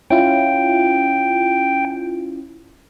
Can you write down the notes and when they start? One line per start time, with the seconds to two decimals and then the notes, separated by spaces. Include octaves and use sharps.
0.10 C#4 E4 F4 G5